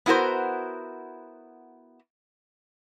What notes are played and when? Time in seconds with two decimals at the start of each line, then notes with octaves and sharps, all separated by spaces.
0.06 B3 E4 F#4 A#4 C5